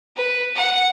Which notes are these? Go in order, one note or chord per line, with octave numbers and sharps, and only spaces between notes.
B4
F#5